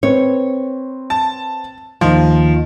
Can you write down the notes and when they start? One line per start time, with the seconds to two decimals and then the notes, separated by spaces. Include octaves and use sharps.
0.03 C4 B4 C#5
1.10 A5
2.01 D#2 D#3 F3 F4